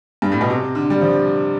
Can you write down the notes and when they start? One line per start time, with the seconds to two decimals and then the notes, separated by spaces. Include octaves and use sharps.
0.22 G2
0.32 A2
0.41 B2
0.50 C3
0.75 D3
0.90 G3
1.01 F3